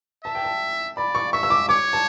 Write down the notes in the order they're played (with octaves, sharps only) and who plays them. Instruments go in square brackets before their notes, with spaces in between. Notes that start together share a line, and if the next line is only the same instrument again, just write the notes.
[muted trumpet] E5 [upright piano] A5
[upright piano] G5
A5
[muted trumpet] D5 [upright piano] B5
[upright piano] C#6
[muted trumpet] E5 [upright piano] C#6
[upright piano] E6
D6
[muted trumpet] C#5 [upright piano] D6
[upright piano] A5